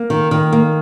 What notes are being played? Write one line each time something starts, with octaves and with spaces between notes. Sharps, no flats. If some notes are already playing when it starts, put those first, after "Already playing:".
Already playing: A#3
D#3
D#3
A#3